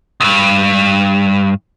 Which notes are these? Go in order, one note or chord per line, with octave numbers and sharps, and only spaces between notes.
C#2 G2